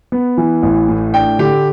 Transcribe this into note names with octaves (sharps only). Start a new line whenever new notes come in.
B3
E3
A1
A2
D4 G5
D3 G4